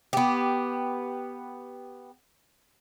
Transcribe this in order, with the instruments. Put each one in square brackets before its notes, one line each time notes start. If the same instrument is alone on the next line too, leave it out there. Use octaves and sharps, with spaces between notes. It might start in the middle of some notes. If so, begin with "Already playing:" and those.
[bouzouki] B3 G4